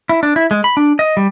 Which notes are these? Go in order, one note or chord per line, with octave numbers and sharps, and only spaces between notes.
E4
D4
E4
G#3
B5
D4
D#5
G3